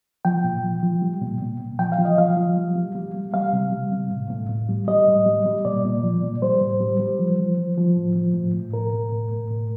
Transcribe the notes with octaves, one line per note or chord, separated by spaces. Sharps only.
F3 G5
A#2
F3
F3
G3
A#2
A#2
A#2
F3 G5
F5
F3
D#5
F3 F5
F3
G3
G3
G3
G3
G3 F5
C3
G3
C3
A2
A2
A2
G3
G3 D#5
A2
G3
G3
A#2 D5
A#2
F3
A#2
G3 C5
A2
G3
G3
F3
F3
F3
F3
A2
F3
A2
A2
A2 A#4
A2
A2
A2
A2